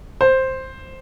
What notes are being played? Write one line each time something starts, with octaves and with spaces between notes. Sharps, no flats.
C5